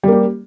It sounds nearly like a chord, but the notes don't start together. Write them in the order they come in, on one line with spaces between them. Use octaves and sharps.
G3 A#3 G4